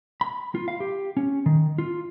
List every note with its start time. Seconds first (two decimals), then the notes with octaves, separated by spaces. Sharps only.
0.21 B5
0.55 F4
0.68 F5
0.80 G4
1.17 C#4
1.46 D#3
1.78 F4